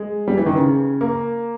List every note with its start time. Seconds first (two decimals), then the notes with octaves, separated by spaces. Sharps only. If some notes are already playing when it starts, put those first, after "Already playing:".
Already playing: G#3
0.28 G3
0.37 E3
0.46 D#3
0.55 C#3
1.01 A#3